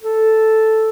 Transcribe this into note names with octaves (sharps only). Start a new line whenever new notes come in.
A4